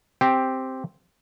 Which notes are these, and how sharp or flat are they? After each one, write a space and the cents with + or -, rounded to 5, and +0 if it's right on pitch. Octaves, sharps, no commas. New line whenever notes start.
C4 +0 G4 +0